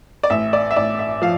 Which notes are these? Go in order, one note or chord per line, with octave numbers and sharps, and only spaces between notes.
D5
A1 E5
D5
E5
A1 D5
E5
F3 F5